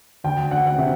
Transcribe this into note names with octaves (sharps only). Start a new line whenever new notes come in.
D2 G5
D2 F#5
F#5
C3 E5